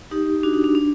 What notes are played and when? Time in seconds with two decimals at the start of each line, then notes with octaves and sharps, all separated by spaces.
0.11 D#4 G4
0.43 D4 F#4
0.54 D#4
0.64 D4
0.75 D4